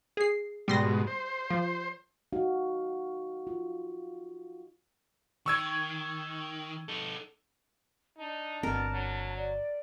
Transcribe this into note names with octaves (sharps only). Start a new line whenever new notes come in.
G#4 C7
G#2 B2 G3 C6 A#6
C5
F3
D#4 F#4 F5
F4
D#3 C#6 E6 G#6
D#4 A4
D4 D#4 A5
G1 B2 C4 A#4
F#3
D5